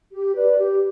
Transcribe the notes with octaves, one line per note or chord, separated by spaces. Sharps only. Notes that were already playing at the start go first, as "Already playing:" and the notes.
G4
B4 D5
G4